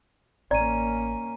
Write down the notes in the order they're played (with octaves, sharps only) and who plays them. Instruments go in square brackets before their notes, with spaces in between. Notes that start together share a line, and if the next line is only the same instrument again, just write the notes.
[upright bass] A1 A3 [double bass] A#3 C#4 [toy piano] D5 [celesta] A#5 D#7